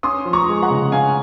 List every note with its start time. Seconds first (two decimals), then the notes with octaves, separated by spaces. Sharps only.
0.03 C#4 C6 D#6
0.25 F3
0.33 A#5 C#6
0.48 G#3
0.63 F#5 A#5
0.70 C#3
0.92 C#4 F5 G#5